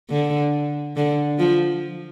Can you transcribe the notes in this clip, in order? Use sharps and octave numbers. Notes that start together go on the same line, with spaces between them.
D3
D3
F3